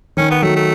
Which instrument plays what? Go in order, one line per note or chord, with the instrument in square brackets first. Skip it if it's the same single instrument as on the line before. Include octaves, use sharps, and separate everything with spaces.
[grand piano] D#3 [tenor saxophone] C#4
[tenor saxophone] B3
[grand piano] F#3 [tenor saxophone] A3
[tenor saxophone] A3